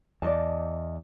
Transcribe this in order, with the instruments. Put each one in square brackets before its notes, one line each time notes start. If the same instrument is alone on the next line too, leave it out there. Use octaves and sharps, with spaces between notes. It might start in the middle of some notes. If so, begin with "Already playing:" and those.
[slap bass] E2 [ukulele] D5 D#5 A5